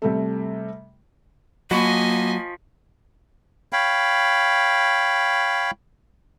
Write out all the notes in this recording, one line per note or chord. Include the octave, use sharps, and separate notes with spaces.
C3 G3 A3
F3 F#3 A#3 D#5 G#5 B5 C#6
C#5 F5 G5 B5